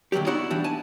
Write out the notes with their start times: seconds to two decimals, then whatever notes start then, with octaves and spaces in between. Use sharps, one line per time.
0.12 D#2 D3 F#3 G3 G4
0.26 B3 D#4 E4 F#4 D5 F#5
0.50 E3 G3 D4
0.64 G#5 A5